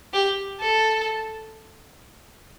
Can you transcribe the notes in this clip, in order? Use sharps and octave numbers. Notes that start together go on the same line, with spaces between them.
G4
A4